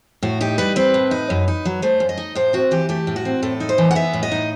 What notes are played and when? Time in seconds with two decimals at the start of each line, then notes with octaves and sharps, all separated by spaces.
0.22 A2 F#4
0.41 D#4 G4
0.58 G3 B4
0.76 C4 B4
0.94 A2
1.11 D#4
1.30 F#2
1.48 D#4
1.65 F#3
1.82 A3 C5
2.00 F#2
2.09 D#5
2.18 D#4
2.35 A2 C5
2.53 C4 F#4
2.71 E3 G4
2.89 A3 G4
3.07 A2
3.16 F#4
3.25 C4
3.42 A2 A4
3.60 D#4
3.69 C5
3.78 E3
3.91 F#5
3.95 B3 E5
4.13 A2
4.23 D#5
4.31 D#4